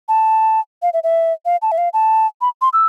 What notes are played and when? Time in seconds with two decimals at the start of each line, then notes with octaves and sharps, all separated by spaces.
0.09 A5
0.82 F5
0.93 E5
1.04 E5
1.45 F5
1.62 A5
1.72 E5
1.78 F5
1.93 A5
2.41 B5
2.62 C6
2.73 E6